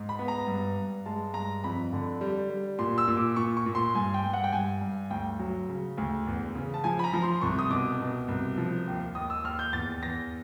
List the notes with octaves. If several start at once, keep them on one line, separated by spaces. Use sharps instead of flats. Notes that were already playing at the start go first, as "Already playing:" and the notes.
Already playing: G#2
B5
B3
A#5
G2
G2
G#3 A5
G2 A#5
F2 B5
D3
G3
G3
A#2 C6
E6
A#2
D6
A#2 C#6
C#6
A#2
C6
G2 G#5
G5
G2
F#5
G5
G2 G#5
G2
D2 G5
F#3
C#3
D2
E2
C#3
A5
F3 G#5
B5
A#5
F3
C6
C2 C#6
D#6
B2 D6
B2
C2
F3
D#2
D#2 D#6
E6
D#2 F6
G6
E2 A6
E2 A#6